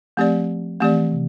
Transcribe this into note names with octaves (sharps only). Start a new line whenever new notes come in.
F3 A3 C4 G4 D5
E3 A3 C4 G4 D5
C3